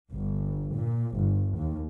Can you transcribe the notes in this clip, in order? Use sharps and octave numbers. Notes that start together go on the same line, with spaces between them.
G1
A#2
G1
D#2